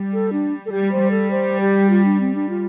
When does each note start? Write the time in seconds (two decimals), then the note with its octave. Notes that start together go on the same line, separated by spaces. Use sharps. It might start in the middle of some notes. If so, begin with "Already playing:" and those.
Already playing: G3
0.13 A4
0.33 D4
0.66 A4
0.72 G3 G4
0.92 C5
1.01 G3
1.11 A4
1.31 C5
1.60 G4
1.90 F4
2.05 D4
2.20 C4
2.35 D4
2.49 F4